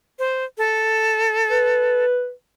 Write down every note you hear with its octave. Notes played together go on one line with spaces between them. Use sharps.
C5
A4
B4